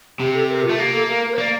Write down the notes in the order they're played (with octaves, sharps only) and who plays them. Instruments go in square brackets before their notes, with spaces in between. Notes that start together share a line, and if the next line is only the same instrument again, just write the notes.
[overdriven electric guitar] C3 [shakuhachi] G4
[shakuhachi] A4
A#4
F4
[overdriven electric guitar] A3
[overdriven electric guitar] A#3 [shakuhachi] G4
[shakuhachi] A4
A#4
A#4
C5
[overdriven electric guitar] A#3 [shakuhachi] D5